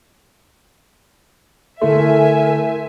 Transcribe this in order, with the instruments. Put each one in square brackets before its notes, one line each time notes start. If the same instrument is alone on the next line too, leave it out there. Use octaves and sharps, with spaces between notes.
[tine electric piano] D3 E4 C6 [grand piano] A3 [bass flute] A#4 [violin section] E5 G#5